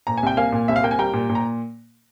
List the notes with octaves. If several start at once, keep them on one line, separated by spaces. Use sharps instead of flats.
A#2 A#5
G#5
C2 G5
A#3 F5 G#5
A#2
C2 E5
F5
A#3 G5
G#5
G3 G5 A#5
A#2
A#2
A#5